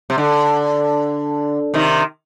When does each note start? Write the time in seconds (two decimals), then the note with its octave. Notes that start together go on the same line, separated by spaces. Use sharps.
0.10 C3
0.18 D3
1.74 C3 D#3